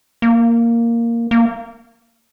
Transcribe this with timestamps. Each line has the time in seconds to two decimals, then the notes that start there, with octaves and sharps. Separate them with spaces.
0.22 A#3
1.31 A#3